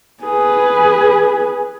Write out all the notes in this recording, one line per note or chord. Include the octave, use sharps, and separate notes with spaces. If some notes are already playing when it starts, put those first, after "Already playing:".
G#4 B4